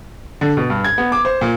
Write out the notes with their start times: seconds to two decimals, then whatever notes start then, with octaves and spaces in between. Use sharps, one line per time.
0.41 D3
0.57 B2
0.70 G2
0.84 G#6
0.98 B3
1.12 D6
1.25 C5
1.41 A#2